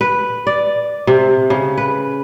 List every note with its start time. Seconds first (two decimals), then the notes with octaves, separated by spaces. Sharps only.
0.01 B4
0.47 D5
1.07 C3
1.50 C#3
1.78 B4